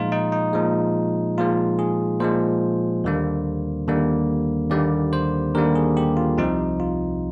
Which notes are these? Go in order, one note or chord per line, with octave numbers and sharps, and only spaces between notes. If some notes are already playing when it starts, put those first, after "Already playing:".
Already playing: A#2 F3 G#3 D#4 F4
D#4
D#4
A#2 F3 G#3
A#2 F3 G#3 F4
G#4
A#2 F3 G#3 C5
D#2 D3 G3 A#3
D#2 D3 G3 A#3
D#2 D3 G3 A#3 D5
C5
D#2 D3 G3 A#3 A#4
G#4
G4
F4
C2 C3 F3 D#4
F4